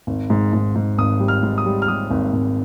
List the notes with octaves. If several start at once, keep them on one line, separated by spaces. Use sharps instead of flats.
G#1
G#2
G#2
G#2
G#1 D#6
G3
F6
G#2
D#6
G3
F6
G3 D#6
G#1
G#1